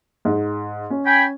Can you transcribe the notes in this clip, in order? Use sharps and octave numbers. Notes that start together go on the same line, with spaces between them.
G#2
C#4
G5 G#5 B5